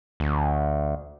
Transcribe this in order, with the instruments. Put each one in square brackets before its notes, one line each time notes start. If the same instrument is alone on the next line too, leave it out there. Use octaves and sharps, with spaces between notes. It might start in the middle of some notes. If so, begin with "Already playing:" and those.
[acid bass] D2